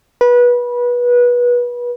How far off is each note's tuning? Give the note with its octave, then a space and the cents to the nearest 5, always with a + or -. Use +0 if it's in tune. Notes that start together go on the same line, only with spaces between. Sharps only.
B4 -25